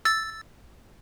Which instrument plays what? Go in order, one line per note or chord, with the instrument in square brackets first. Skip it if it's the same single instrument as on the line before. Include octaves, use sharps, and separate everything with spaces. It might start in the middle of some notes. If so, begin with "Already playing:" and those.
[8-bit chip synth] E6 A6